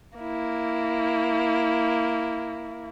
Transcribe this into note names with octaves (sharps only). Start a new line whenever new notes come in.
A#3 E4